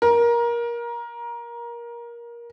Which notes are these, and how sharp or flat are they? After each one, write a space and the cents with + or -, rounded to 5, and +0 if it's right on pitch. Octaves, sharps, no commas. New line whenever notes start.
A#4 +20